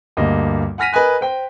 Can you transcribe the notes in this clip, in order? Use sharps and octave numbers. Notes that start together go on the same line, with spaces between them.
D2 G2 A#3 D#5
F#5 G#5 F6 A#6 B6 D#7
A#4 B4 D#5 G#5 F#6
C5 G5